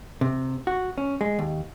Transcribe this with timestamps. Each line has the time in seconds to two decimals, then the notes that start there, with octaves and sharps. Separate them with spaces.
0.21 C3
0.67 F#4
0.98 C#4
1.21 G#3
1.39 D#2